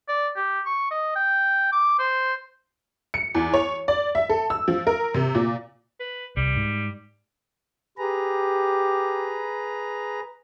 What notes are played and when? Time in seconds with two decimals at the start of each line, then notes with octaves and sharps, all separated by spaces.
0.08 D5
0.36 G4
0.66 C#6
0.91 D#5
1.16 G5
1.72 D6
1.99 C5
3.14 C#7
3.35 E2
3.53 C#5
3.88 D5
4.15 E5
4.29 A4
4.50 E6
4.68 F3
4.87 A#4
5.14 C3
5.35 A#2
6.00 B4
6.37 C2 G3
6.56 G#2
7.98 G4 G#4 B4 A#5